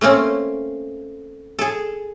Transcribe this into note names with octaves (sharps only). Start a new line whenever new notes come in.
A3 A#3 C4 C#4
G#4 A4